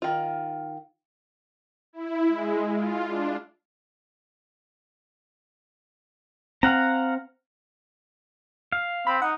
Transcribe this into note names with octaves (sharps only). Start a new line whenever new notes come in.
D#3 F4
E4
G#3
F4
D4
C4 F5 F#5 A#5
F5
C4 B5
D#4 F#5